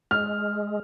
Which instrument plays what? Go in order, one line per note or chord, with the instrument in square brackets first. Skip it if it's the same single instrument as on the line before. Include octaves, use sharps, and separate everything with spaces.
[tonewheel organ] G#3 [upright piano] F6